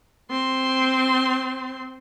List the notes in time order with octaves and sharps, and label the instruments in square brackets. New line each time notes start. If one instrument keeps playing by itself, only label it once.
[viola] C4 C6